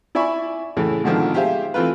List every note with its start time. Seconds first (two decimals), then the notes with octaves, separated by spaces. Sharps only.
0.15 E4 D5 E5 G#5 B5 C#6
0.77 A2 C#3 E3 A3
1.04 G#2 B2 D3 D#3 F3
1.34 G4 G#4 C5 E5 F5
1.74 E3 A3 C4 F4 B4